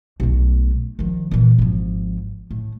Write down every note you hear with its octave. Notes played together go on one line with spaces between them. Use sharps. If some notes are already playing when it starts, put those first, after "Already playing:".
B1 A3
D#3 F3
A#2 E3
G#1 F3
A2